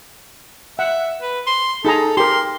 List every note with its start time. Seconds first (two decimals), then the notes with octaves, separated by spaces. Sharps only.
0.79 E5 F#5
1.22 B4
1.47 C6
1.85 D#4 G#4 A4 A#5
2.17 G4 A#4 C6